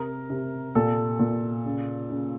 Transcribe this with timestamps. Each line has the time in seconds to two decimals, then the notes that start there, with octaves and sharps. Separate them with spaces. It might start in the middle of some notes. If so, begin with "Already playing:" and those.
Already playing: C3 A#4
0.30 C3
0.75 A#2 A4
1.20 A#2
1.66 C#3
2.10 C#3